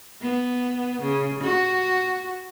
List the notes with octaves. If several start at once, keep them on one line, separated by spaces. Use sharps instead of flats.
B3
C#3
F#4